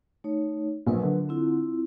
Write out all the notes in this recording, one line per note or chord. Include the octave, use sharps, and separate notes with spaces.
A3 D#4 C#5
A#1 F#3 A#4 B4
D3
C4 E4 F4